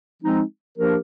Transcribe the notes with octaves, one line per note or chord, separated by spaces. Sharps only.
F3 G#3 C4 D#4
F3 A#3 D4 G4 A#4